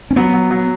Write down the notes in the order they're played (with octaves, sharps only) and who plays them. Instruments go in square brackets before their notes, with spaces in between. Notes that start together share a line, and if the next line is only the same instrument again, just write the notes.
[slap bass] C#4
[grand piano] F#3 [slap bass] B3
[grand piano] F#3
F#3